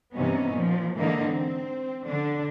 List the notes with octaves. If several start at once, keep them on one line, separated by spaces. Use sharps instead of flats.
G2 C3 E3 B3 C#4 D#4
A#2 F3
G#2 D3 E3 A#3 D#4
C4
D3 D4